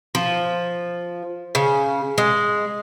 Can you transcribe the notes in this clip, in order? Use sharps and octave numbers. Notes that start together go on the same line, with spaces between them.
F3
C#3
G#3